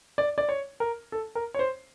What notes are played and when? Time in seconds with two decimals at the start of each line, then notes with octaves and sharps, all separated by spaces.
0.18 D5
0.38 D5
0.49 C#5
0.80 A#4
1.12 A4
1.35 A#4
1.54 C#5
1.59 C5